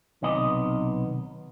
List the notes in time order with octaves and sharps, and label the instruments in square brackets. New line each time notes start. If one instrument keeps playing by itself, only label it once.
[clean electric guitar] B1 C3 D#3 B3 D#5